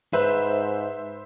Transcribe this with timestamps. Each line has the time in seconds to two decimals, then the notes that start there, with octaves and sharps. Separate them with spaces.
0.13 G#2 B4 C5 E5